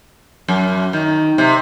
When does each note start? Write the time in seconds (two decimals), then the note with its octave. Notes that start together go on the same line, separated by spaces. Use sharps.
0.48 F#2
0.93 D#3
1.38 C3